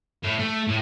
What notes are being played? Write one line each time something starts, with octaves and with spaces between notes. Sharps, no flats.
A2
A3
A2